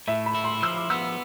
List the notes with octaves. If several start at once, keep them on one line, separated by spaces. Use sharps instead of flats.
A2 E5
B5
E4
C6
F3 E6
D6
B3 E6